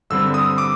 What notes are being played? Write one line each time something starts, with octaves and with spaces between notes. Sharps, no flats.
G2 D3 G3 C4 E6
D#6
D6